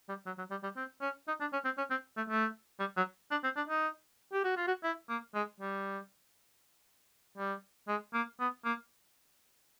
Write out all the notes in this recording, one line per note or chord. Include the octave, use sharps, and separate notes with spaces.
G3
F#3
F#3
G3
G3
C4
C#4
D#4
D4
C#4
C4
C#4
C4
A3
A3
G3
F#3
D4
C4
D4
D#4
G4
F#4
F4
F#4
E4
A#3
G#3
G3
G3
G#3
A#3
B3
A#3